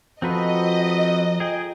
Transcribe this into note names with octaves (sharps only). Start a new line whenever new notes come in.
F3 C4 F4 F#4 A4 B4 D#5 A#5
G#4 G5